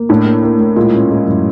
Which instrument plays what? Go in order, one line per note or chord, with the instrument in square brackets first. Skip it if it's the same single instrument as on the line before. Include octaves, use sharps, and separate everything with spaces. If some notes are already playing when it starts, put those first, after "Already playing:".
Already playing: [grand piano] A#3
[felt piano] A2 [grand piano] D4
[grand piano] A#3
A#3
A#3
[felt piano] A#2 [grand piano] G#3
[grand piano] C#4
G#3
F#2